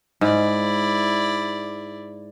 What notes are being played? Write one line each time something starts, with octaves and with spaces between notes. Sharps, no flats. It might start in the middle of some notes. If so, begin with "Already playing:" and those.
G#2 E4 D5